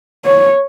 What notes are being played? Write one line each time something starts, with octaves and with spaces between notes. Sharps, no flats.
C#5